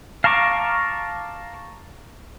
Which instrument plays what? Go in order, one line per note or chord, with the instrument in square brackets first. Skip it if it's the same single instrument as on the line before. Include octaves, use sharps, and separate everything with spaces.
[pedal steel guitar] F5 A5 A#5 C#6 D6